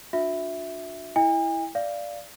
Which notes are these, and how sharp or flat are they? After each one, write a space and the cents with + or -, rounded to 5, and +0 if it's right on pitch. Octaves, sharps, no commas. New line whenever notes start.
D4 +0 F#4 -40 E5 +0
E4 +0 D#5 +35 G#5 -45
D5 +0 F5 -15